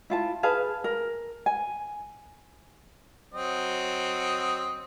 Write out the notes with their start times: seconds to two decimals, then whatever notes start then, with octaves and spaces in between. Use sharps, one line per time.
0.10 E4 F4 A5
0.43 G#4 B4 F5 A5
0.84 A#4
1.46 G#5
3.34 F#3 C4 D#5